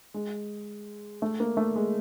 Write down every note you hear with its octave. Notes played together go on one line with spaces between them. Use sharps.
G#3
A3
A#3
A3
G#3